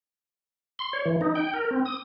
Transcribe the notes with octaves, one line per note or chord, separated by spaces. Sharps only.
C6
C#5
E3
D#4
G5
A#4
C4
D#6